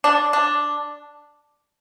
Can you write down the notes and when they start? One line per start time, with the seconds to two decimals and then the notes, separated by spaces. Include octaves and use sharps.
0.04 D4
0.33 D4